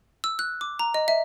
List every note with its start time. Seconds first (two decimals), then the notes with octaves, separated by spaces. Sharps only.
0.24 E6
0.39 F#6
0.61 D6
0.79 A#5
0.94 D#5
1.08 E5